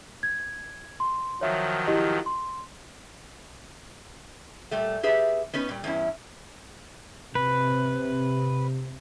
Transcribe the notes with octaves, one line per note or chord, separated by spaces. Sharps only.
G#6
C6
D#3 F3 F#3 C#5 E5
E4 G4 D#5
C6
A#2 G3 A3
G4 G#4 B4 E5
B3 C#4 D#4 B4
A#2 G3
E2 G2 C#4 E4
C3 B4